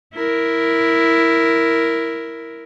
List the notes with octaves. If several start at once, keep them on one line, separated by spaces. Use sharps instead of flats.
E4 A#4